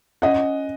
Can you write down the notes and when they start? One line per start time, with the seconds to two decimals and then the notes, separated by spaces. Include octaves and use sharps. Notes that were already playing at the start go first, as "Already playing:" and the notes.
0.22 C#4 D#5 F#5